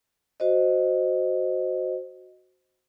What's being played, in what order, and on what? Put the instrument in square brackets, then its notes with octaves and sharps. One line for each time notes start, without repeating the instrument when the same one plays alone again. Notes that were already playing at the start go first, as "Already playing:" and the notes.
[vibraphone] F#4 C5 D#5